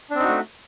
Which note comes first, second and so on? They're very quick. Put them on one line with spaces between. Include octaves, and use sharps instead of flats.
D4 C4 D#4 F#4 A3